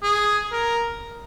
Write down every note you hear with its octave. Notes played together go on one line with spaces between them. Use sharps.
G#4
A#4